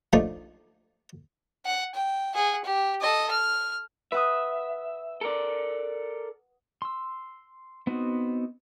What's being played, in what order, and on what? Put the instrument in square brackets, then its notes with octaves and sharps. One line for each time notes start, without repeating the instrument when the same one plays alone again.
[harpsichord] F3 A3 D4 D#4
[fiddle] F#5
G5
G#4 F#5
G4
A4 D#5
F6
[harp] B4 F#5 D#6 [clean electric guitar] E5
[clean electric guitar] A4 A#4 D5
[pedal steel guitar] C6 E6
B3 C4 D#4 F#4